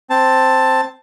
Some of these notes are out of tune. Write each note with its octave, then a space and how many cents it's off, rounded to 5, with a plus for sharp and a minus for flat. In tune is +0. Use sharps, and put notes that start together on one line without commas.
C4 +0 A5 +10